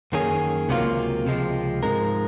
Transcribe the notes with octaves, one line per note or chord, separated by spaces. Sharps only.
F#2 D#3 A#3 C#4 G#4
C#2 C3 F#3 A#3 F4
C#2 C3 F3 G#3
G#2 F3 G#3 D#4 A#4